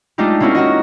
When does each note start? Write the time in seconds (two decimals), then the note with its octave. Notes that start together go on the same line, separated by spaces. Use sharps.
0.18 G#3 A3 D4 D#4 F4 G4
0.40 A#3 C4 C#4 E4 F#4 A#4
0.55 D#4 E4 F#4 D#5